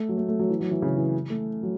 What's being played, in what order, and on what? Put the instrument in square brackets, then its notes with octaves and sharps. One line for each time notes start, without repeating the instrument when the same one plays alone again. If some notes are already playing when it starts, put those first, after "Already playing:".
Already playing: [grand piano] A3
F#3
A3
A3
F#3
E3
F#3
E3
C#3
E3
A3
F#3